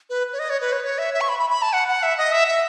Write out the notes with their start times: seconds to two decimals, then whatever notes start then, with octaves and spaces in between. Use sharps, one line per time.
0.10 B4
0.33 C#5
0.39 D#5
0.50 C#5
0.61 B4
0.73 C#5
0.84 C#5
0.98 E5
1.14 E5
1.21 C#6
1.29 B5
1.39 B5
1.50 B5
1.62 A5
1.73 F#5
1.88 F#5
2.03 E5
2.18 D#5
2.32 E5
2.48 E5